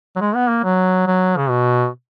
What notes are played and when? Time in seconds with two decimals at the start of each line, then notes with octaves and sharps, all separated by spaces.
0.16 F#3
0.21 G#3
0.35 B3
0.49 A#3
0.64 F#3
1.07 F#3
1.38 C#3
1.49 B2